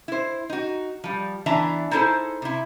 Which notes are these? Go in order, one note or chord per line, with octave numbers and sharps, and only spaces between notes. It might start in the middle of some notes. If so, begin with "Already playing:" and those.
E4 C5
D#4 F#4
F3 G3
E3 B3 D4 E5 A5 A#5
D#4 E4 G#4 A4 C5
C3 E4